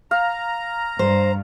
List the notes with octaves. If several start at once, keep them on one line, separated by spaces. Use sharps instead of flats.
F5 A#5
G2 C5